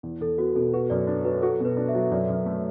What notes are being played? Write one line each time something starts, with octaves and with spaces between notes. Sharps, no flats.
E2
E2 A4
B3 F#4
B2 A4
F#4 B4
F#2 D5
D4
F#3 B4
F#4 A4
B2 B4
D4
E5
F#3
F#2 D5
F#2
A3